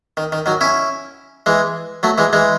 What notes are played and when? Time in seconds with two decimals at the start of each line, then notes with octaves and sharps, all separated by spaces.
0.17 D#3
0.32 D#3
0.46 D#3 F#3
0.61 C#4 E4
1.46 E3 G#3
2.03 F#3 A3
2.18 E3 G#3
2.33 E3 G#3